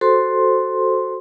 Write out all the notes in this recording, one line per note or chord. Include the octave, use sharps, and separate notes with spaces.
F#4 A4 C5 C6